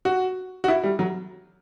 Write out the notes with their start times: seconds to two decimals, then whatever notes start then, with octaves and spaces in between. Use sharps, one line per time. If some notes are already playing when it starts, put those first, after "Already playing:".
0.05 F#4
0.64 F#4
0.68 E4
0.83 G3
0.99 F#3